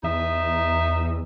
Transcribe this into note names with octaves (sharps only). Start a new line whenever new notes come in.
E2 D#4 D#5 E5